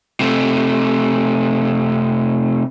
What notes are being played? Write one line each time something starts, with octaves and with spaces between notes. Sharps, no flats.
C3 A3